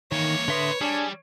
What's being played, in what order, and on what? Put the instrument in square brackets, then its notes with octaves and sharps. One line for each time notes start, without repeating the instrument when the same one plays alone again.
[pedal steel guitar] D#3 [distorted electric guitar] E3 A#3 [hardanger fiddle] C#5
[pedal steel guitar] D3 E5 D#6 [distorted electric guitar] A#3 C6 [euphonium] B4
[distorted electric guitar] G3 [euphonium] D4 [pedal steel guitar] G#4 G#5